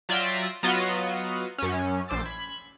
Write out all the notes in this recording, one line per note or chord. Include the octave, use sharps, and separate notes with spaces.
F#3 F4 D5 E5 G5 A#6
F#3 B3 F4 F#4 D#5
F#2 C#4
A#1 C5 D6 E6 A6
B5 G#6